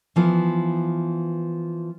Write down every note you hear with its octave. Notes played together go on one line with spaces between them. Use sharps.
E3 F3 B3